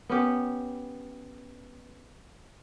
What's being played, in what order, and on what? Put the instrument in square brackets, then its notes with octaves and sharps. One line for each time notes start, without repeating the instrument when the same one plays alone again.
[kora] B3 C#4 G4